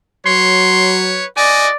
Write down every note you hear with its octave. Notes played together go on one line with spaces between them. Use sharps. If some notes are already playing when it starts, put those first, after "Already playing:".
F#3 B4 C#5 C6
F#4 D5 D#5 G#5